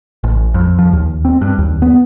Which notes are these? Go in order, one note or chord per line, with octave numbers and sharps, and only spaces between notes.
A1
F2
F3
D#2
C4
G2
D#2
B3